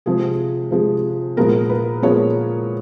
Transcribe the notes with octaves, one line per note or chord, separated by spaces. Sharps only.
C3 F3 G#3 G#4
C3 F3 G#3
A#2 F3 G#3 B3 A#4
B4
A#2 F3 G#3 B3 C#5